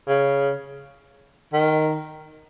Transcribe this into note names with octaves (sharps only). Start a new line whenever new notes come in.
C#3
D#3